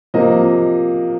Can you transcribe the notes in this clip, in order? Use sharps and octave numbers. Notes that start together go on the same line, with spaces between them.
C3 F3 A#3 D#5